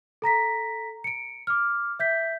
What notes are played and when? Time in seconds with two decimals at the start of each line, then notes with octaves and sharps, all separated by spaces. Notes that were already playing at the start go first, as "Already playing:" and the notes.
0.22 A4 A#5 A#6 B6
1.04 C#7 D7
1.47 D6 F6
1.99 E5 G6 B6